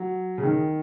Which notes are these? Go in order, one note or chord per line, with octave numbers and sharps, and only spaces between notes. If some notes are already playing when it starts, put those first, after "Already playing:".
Already playing: F#3
C#3
D#3